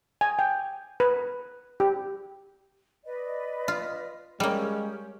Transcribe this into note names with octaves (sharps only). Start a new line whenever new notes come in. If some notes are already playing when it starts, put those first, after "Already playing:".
G#5
G5
B4
G4
B4 D5 D#5
F4
G3 G#3 A#3 C#4 G4